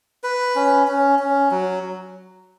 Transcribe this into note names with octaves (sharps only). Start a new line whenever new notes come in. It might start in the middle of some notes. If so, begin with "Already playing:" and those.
B4
C#4
C#4
C#4
F#3